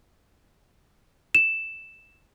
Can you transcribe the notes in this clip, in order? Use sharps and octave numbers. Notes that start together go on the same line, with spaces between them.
E7